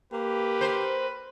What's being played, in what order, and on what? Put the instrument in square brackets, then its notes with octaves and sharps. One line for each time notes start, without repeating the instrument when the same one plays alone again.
[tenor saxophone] A#3 [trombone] G4 [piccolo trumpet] B4
[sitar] A#4 C5